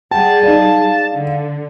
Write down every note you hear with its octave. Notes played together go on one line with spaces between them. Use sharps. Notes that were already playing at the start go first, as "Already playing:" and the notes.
G3 G#4 F#5 G5 A5
D#4 D5 F5
D3